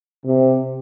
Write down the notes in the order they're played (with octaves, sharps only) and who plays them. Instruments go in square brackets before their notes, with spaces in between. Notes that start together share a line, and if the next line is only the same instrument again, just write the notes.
[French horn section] C3